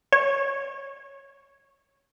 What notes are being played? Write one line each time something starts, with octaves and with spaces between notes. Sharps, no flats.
C#5